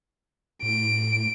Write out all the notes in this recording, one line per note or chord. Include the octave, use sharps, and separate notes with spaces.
A2 D7